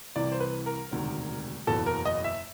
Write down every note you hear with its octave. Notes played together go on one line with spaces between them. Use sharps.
C2 C3 E3 D5
C5
B4
A#4
E1 D2 C3 D#3
F#1 E2 B2 A4
A#4
D#5
E5